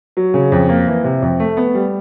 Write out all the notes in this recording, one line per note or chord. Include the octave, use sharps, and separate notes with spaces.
F#3
C#3
F2
A#3
E3
C3
F2
A3
B3
G3